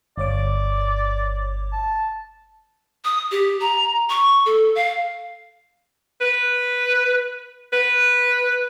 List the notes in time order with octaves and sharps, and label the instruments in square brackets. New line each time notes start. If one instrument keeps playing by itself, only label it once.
[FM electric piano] G1 C#5 D6 [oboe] D5
[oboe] A5
[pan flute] D#6
G4
A#5
C#6
A4
F5
[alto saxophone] B4
B4